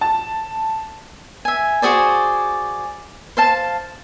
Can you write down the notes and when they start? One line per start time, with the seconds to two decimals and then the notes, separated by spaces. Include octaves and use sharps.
0.01 A5
1.45 E5 G#5
1.82 F#4 G#4 C5 D5
3.37 C5 F5 A5